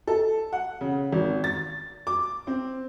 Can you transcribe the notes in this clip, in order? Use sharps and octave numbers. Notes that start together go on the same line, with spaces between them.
A4
F#5
C#3
G#1
A6
D6
C4